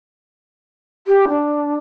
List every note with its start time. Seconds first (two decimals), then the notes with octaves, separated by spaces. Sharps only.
1.07 G4
1.28 D4